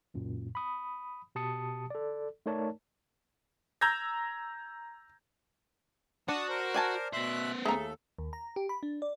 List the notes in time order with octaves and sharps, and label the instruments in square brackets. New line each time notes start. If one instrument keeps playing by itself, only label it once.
[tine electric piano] C#2 F#2 A#2
B5 D#6
B2 G4 A5 D#6 C#7
A4 D5
A3 D#4 A#4 C#5 D5 A5
[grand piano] A#5 E6 G6 G#6 A#6
[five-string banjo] D4 [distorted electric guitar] F#4 [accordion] A5 D#6
[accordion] A#4 C5
[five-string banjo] D5 G#5 A5
[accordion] B2 E5 F#6 [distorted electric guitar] B3 C5
[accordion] D#2 A4 [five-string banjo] A3 [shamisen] G#4 A#5
[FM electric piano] D#2
A#5
G4
B5
D4
D5